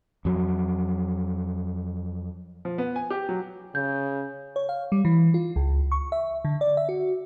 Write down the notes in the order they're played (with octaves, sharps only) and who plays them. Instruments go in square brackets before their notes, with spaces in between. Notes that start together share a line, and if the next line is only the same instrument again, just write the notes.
[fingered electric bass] F2 F#3
[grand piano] F3
B3
G#5
G4
F#3
[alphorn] C#3 [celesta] G6
[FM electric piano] C#5
F5
G3
E3
F4
C#2
C#6
E5
D3
D5
E5
F#4